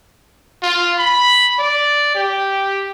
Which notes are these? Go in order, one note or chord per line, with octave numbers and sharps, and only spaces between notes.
F4
B5
D5
G4